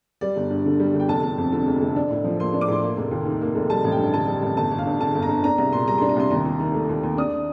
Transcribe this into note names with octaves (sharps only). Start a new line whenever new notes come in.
G3 D5
G1
G2
D3
G3
G1
G5
F1 A5
F1
F2
D3
F1
F1
D4
A2
F3
A#3 C6
D4
D6
A2 C6
A#3
F1
D#2
D#3
A#3
F1
G3 A5
A1
G5
G2
D3 A5
G3
A1
G1 A5
G1
F5
G2
D3 A5
G1
A#5
G1
D4 A#5
C2 A#5
A#2 C6
G3 A#5
C6
D4
A#5
C2 C6
D#2 A#5
D#2
D#3
A3
D#2
D#2
D4 D#6